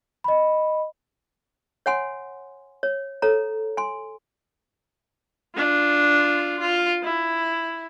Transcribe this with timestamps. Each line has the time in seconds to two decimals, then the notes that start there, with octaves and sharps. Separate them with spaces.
0.24 D#5 B5
1.86 C#5 F#5 G#5 C6
2.83 C#5
3.22 A4 C#5 A#5
3.77 G#5 C6
5.55 D4 F4
6.60 F4
7.03 E4